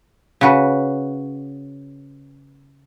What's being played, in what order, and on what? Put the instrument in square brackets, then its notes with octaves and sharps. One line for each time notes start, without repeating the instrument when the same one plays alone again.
[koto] C#3 F#4 B4